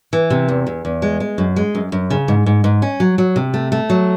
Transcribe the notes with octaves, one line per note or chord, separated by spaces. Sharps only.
E3
C3
E2
E2
E2
G#3
G#3
F#2
G#3
F#2
F#2
C#3
G#2
G#2
G#2
C#4
F#3
F#3
C3
A3
A3
F#3